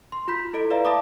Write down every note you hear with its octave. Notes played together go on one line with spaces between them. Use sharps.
C6
F4 B5 G6 B6
E4 A4 D#5 D7
B4 D5 E5 F5 A#5
E5 F5 A5 B5 D6 D#6